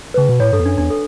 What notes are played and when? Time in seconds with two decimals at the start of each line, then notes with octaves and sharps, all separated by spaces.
0.14 B4
0.17 C#3
0.29 B2
0.40 A2 C#5
0.53 G2 A4
0.60 E2
0.65 F#2 D4
0.78 E2 D4
0.90 A4